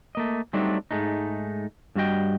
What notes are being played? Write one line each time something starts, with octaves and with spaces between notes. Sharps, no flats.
A3 A#3 D#5
F#3 G3 A3 C4 D4 D#4
G#2 G#3 A3 D#4
G2 G3 F#4 D#5 G5